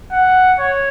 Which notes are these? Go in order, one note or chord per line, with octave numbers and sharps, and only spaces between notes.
F#5
C#5